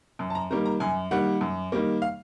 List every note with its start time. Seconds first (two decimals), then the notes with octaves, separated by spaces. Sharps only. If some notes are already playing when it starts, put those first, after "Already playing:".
0.19 F#2
0.30 A5
0.35 A#5
0.51 D#3 G3 A#3 A#5
0.66 A#5
0.80 F#2 G#5
1.11 D#3 G3 A#3 F#5
1.41 F#2
1.72 D#3 G3 A#3
2.02 F5